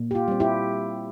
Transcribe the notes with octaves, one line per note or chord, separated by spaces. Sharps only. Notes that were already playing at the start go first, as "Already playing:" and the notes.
Already playing: A#2
G4
F4
G3 C4
E4 G4